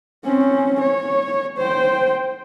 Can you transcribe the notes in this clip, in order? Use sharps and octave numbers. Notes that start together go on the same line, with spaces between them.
C4 C#4
C#5
C5 G5